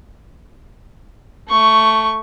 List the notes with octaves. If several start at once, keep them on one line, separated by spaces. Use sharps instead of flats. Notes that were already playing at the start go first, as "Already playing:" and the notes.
A3 C#6